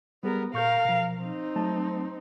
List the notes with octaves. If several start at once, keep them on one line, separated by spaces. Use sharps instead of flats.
G3 B3 G4 G#4 A#4
A#2 A#4 F5 C#6 G6
B2 F3
C4 D#4
F#3 A3 A5